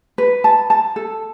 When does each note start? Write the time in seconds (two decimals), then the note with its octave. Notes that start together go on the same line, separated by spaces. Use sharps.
0.18 B4
0.44 A5
0.70 A5
0.96 A4